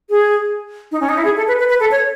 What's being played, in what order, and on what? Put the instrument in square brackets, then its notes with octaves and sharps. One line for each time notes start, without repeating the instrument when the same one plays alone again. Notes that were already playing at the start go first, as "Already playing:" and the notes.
[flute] G#4
D#4
C#4
D#4
E4
G#4
A4
B4
B4
B4
A4
C#5